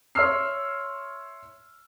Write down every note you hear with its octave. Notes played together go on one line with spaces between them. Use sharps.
C#5 E5 C6 E6 F6 C7